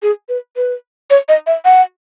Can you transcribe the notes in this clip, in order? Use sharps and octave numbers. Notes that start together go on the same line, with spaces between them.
G#4
B4
B4
C#5
D#5
E5
F#5